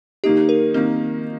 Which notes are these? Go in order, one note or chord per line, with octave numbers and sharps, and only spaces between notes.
D#3 A#3 D#4 G4
A#4
D#3 A#3 C4 D#4